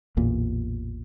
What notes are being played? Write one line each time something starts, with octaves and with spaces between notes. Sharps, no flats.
A1 E2 A#2